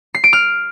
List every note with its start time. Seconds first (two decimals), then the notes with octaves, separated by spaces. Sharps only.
0.15 C7
0.24 D7
0.33 F6